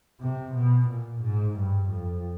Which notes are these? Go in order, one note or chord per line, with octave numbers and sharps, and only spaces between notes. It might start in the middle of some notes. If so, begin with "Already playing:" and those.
C3
B2
A#2
G#2
G2
F2